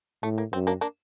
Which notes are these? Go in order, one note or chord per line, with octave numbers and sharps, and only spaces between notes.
A2 A3
A#3
F#2 C4
A#3 D4
A#3 D4